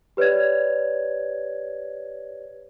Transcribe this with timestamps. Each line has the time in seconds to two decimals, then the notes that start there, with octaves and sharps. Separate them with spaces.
0.17 G4 B4 C#5 D5 G#6